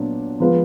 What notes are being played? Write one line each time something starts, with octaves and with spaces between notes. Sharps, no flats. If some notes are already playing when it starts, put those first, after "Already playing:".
Already playing: A#2 F#3 B3 D4
F3 G#3 B3 F4 B4